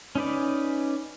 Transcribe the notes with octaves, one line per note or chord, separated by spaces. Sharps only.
C#4 D#4 B4 D5